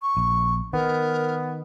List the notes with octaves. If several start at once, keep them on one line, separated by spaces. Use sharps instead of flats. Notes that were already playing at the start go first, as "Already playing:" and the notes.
C#6
A#1
D#3 B3 A#4